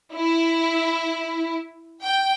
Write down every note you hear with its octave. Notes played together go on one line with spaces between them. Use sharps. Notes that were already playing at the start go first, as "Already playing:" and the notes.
E4
G5